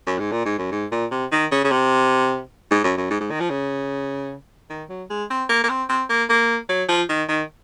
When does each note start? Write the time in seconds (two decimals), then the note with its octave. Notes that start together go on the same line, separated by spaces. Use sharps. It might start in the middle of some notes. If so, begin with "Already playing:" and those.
0.07 F#2
0.19 G#2
0.32 A#2
0.46 G#2
0.58 F#2
0.72 G#2
0.92 A#2
1.12 C3
1.32 D#3
1.51 C#3
1.65 C#3
1.71 C3
2.71 G#2
2.84 F#2
2.97 F#2
3.10 G#2
3.21 G#2
3.31 D#3
3.40 F3
3.50 C#3
4.70 D#3
4.90 F#3
5.10 G#3
5.30 C4
5.49 A#3
5.64 A#3
5.69 C4
5.89 C4
6.10 A#3
6.29 A#3
6.69 F#3
6.89 F3
7.09 D#3
7.29 D#3